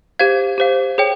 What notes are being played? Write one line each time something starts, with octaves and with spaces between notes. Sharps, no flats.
G4 C5 F5 G#6
G4 C5 F5
G#4 C#5 G5